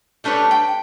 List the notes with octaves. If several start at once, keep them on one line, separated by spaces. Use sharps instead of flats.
G3 A3 D4 B4 C#5
G5